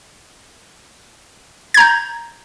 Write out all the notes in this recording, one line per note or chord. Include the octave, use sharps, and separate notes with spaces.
A#5 G6 G#6